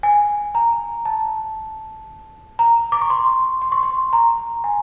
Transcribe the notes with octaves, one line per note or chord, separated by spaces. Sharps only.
G#5
A#5
A5
A#5
D6
C#6
C6
C6
C#6
C6
A#5
G#5